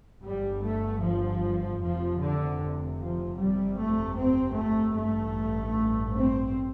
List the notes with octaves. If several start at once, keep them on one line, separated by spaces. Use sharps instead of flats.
G1 G2 G3
A3
F3
F1 F2 C3 F3
D3
F3
G1 F2 C3 G3
A3
C4
A3
A1 G2 A3
C4